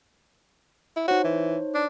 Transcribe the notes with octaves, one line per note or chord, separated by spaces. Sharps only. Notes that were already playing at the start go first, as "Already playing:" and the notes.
E4
D#4 F#4 C5 C#5
E3
D4